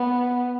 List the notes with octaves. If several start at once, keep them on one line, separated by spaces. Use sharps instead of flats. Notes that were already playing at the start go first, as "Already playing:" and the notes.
Already playing: B3